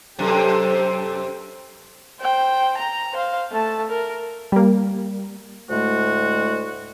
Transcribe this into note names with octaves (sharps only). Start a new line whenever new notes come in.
F#2 C3 G4 A4
C5 G5
A#5
C5 F5
A3 A5
A#4
G3 A#3
D2 A2 G#3 A3 F#4